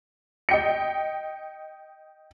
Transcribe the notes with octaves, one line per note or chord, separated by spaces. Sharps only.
D#5 G5 C#7